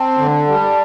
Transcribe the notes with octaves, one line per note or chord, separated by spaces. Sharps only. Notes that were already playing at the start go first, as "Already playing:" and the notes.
Already playing: C4 A5
D3
G3